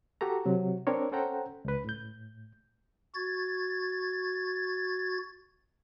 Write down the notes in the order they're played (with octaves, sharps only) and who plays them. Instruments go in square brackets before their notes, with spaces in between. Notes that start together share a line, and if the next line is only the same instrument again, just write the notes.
[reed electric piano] F#4 G4 A4 A#5
C3 F#3
C4 D4 A#4 C#5
C#4 A4 C5 F#5 G5 A#5
C#2 B4
A2 G6
[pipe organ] F#4 G#6 A6